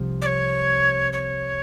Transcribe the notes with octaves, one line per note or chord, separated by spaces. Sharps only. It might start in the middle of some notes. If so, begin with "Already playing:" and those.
Already playing: C2 C3 F3
D5
C#5
C#5